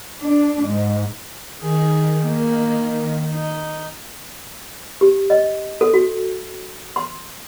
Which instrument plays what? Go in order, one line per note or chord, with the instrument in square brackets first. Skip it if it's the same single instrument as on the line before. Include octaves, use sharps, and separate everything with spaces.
[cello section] D4
G#2
[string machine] D#3 [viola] G#4
[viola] A#3
D#4
[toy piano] G4
D#5
A4
F#4
C6